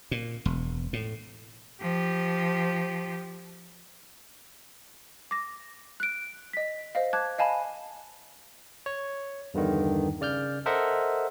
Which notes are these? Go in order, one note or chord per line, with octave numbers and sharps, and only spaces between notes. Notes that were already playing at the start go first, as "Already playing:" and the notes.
A#2
E1
A2
F3 G4
D6 A#6
F#6 D7
D#5 B6
C5 D#5 F5
A5 D6 F#6 G#6
D#5 F5 G#5 A5 B5
C#5
E2 G2 D3 D#3
C#3 D5 F6 G6
A4 A#4 C5 D#5 E5 F#5